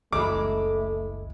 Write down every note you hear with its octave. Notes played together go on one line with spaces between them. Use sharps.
F#1 C#2 E3 G#3 A3 E4 D6